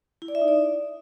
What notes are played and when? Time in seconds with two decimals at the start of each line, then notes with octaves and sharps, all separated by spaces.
0.22 E4
0.28 D5
0.35 E5
0.41 D#4
0.48 D5